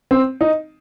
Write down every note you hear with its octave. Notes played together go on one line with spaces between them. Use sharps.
C4
D#4